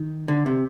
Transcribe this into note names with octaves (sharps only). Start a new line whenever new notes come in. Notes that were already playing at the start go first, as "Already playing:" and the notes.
Already playing: D#3
D3
C3